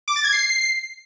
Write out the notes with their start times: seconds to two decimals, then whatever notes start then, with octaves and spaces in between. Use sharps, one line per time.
0.08 D6
0.16 A6
0.24 G#6
0.32 C7